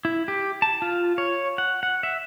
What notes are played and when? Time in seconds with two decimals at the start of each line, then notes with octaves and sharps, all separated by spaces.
0.05 E4
0.28 G4
0.62 A5
0.82 F4
1.18 C#5
1.58 F#5
1.83 F#5
2.03 E5